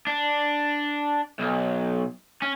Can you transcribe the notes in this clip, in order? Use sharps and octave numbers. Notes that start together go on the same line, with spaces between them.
D4
B1
C#4